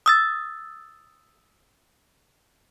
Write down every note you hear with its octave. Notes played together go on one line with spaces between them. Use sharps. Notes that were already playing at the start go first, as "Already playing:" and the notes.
D#6 E6 A6